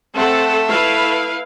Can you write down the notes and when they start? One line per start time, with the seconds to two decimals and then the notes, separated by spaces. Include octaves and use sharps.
0.15 A3 C4 A4 F#5
0.69 E4 B4 F5